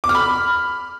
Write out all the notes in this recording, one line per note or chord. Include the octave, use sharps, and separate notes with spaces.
D6
F6
B5